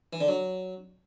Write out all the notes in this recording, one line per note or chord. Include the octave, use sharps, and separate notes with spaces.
E3
D3
F#3